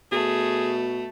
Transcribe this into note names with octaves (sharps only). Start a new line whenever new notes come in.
B2 A3 G#4